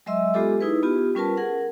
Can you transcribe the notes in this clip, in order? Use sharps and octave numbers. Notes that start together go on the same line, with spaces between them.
F#3 G#3 D#5 E5 C6 E6
G#3 B3 F4 G4 A4 D6
D#4 E4 G#4 B4
B3 F4 G4
G3 C#4 F4 A#4 B4 A5
G#4 A#4 F#5